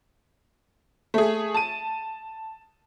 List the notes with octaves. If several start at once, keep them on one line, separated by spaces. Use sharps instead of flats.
A3 G#4
A5 D#7